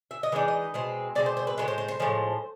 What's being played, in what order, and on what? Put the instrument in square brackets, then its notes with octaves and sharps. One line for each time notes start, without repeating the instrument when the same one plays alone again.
[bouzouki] E5
D#5
E3 G#3 C4 D#4 D5
D#5
B2 G#3 C4
B2 G#3 C4 D5
C5
C5
B4
A2 F3 G#3 B4
C5
C5
C5
A2 F3 G#3